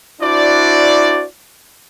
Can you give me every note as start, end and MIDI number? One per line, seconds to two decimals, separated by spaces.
0.22 1.24 62
0.22 1.24 64
0.22 1.24 66
0.22 1.24 72
0.22 1.24 74